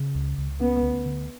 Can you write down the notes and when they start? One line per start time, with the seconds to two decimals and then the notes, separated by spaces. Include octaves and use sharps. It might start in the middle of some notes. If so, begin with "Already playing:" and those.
Already playing: C#3
0.15 C#2
0.38 C#2
0.61 B3 C#4
0.83 D2
1.06 D3